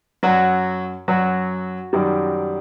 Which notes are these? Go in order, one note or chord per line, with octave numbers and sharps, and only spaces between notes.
F#2 F#3 F#4
F#2 F#3 F#4
F#2 D#3 G3